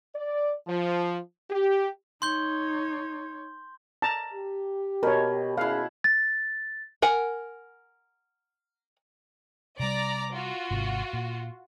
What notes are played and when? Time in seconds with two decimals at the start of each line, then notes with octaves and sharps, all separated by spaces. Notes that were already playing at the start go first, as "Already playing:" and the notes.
0.15 D5
0.68 F3
1.50 G4
2.22 D#4 C#5 C6 G6 G7
4.02 A5 A#5
4.33 G4
5.03 B2 A#4 C#5
5.57 D#2 C#4 E4 G#4 F5 F#5
6.04 A6
7.02 A#4 F#5 G#5
9.79 C3 G3 D5 A#5 D6
10.31 F4 F#4
10.71 G#1 G#2 C3
11.13 A#2